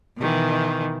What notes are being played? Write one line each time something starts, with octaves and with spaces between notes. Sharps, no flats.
B2 D#3 E3